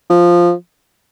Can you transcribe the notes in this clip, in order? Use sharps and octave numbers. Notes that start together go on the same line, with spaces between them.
F3